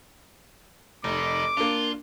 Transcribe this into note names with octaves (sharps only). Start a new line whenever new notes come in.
F1 D#3 D#4 D6
A#3 D4 F4